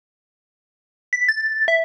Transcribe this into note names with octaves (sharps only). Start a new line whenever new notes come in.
B6
A6
E5